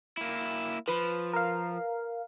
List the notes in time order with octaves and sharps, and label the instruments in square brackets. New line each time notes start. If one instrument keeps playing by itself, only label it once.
[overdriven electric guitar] A#3 E4
[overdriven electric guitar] F3 [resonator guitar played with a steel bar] B4
[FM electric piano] A#4 F5